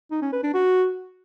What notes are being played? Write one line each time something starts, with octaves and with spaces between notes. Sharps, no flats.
D#4
C#4
B4
D4
F#4